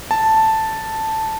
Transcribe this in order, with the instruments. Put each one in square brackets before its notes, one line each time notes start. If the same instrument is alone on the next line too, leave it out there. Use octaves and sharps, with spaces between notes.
[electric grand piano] A5